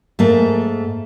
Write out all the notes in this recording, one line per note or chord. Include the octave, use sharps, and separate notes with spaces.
G#2 A3 A#3